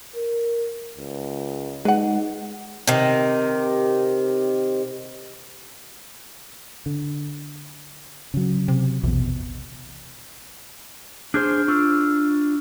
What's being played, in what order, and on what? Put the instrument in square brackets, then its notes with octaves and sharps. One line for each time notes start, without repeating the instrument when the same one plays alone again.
[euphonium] A#4
C#2
[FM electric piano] G#3 [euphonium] D#4 [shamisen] B4 F#5
[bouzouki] C3 D#3
[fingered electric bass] D3
C#3 F#3
[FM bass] C3
[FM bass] A#1 [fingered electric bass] E2 B2
[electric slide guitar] D4 G#4 C5 [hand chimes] F6 G6
[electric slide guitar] D4 F4 [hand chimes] C#6 E6 F6